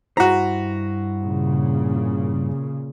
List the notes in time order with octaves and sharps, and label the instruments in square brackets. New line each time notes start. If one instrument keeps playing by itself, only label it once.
[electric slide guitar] G2 E4 C5 [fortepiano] F#4 A#5
[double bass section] A#2 C#3